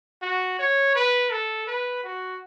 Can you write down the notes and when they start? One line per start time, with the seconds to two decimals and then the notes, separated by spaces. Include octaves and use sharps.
0.22 F#4
0.59 C#5
0.95 B4
1.31 A4
1.67 B4
2.04 F#4